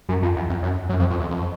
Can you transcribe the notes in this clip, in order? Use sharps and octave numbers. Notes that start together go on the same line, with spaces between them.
F#2
F2
E2
F2
F#2
F#2
F2
F2
E2
F2